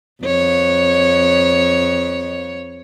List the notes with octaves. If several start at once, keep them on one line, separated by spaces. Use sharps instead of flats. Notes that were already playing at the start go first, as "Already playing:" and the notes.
F2 C#5